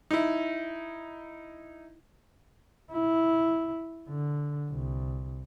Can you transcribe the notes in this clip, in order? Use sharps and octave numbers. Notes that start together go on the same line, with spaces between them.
D#4 E4
E4
D3
C2